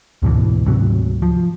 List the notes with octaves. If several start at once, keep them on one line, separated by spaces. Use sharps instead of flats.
D2 G#2 B2 E3
D2 G#2 C3 F#3
F3